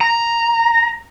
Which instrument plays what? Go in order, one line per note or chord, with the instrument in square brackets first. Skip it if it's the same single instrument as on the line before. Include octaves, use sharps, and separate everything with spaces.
[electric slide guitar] A#5